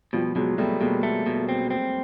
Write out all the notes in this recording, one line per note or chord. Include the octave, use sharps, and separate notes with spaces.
B2 F3 G3
B2 F#3 G#3
B2 G3 A3
B2 G#3 A#3
A3
B2
C4
C4